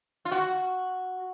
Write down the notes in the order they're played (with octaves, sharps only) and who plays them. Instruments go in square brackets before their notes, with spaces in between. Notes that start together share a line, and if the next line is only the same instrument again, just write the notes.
[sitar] F4
F#4